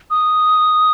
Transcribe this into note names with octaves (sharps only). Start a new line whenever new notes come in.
D#6